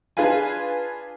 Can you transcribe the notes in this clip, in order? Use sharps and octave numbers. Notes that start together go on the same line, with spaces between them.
D4 F4 G#4 B4 F5 G#5